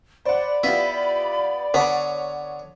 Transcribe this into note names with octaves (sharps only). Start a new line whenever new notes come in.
C5 D5 F#5 B5
B3 E4 F4 G4
D3 B3 C#5